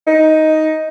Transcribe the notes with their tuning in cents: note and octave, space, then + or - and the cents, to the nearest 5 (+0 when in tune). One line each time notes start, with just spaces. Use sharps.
D#4 +10